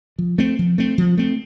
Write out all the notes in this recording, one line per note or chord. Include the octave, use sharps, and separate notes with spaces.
F3
A3 C4
F3
A3 C4
F3
A3 C4